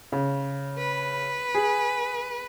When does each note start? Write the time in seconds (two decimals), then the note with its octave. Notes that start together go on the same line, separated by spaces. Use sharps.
0.12 C#3
0.78 B4
1.55 G#4